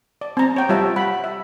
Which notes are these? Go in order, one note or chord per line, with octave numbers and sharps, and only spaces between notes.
D5
C4 A#5
C#5 G5
G3 F4 C#5 E5 A5
F#5 B5
E5